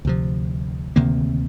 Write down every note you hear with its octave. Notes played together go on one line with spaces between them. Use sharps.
D2 C3 F3
D2 C3 D#3 A#3